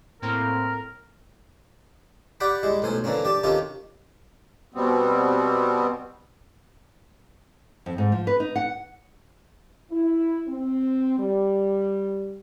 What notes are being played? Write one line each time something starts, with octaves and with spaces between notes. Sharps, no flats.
A2 A#3 C4 A#4
G4 D5 F#5 G5 B5
G3 G#3 E4
B1 A2 C5 G#5
D3 E3 A#3 C4 C#4
G4 D5 A5
C3 D#3 C#4 F4 G4 A4
B2 G3 B3 C4
F2
G#2
F3
B4
D#4
F#5
E4
C4
G3